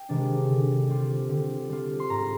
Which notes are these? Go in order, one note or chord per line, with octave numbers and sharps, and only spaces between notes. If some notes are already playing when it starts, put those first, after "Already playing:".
Already playing: G5
C3 D#3 G#3 D4
D3
G3 C4 F4
D3
G3 C4 F4
C6
G#2 A#5